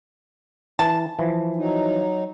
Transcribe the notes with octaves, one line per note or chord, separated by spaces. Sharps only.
E3 A5
E3 F3
F#3 D#4